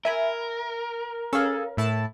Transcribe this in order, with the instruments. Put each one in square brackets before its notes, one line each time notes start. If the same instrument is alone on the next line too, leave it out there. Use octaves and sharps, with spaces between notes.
[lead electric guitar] A#4 [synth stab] E5 G#5 B5
[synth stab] C#4 F5 [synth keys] G#4 A4
[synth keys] A2 E4 A5